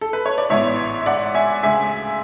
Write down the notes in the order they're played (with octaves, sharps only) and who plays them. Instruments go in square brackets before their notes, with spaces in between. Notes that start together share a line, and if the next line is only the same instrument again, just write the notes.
[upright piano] A4
B4
C#5
D5
A1 G#2 E3 B3 C#5 E5
E5
D5 F#5
E5 G#5
D2 C#3 G#3 E5 G#5